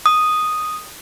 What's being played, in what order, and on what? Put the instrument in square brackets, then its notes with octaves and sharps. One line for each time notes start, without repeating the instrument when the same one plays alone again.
[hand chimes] D#6